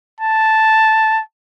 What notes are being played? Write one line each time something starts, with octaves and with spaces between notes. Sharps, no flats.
A5